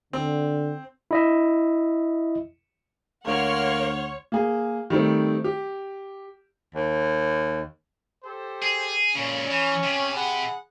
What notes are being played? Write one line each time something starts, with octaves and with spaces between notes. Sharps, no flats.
D3 C4
E4 D#5 E5
D2 A#3 C#5 F#5 C6 F6
A#3 G#4
D#3 G3 A3 C4
G4
D#2
G4 A4 C5
G#4
A#2 C#3 C#4
E3
C3
G#4 F#5 B5